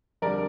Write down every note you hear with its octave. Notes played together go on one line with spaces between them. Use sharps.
F2 D3 G3 A#4 D5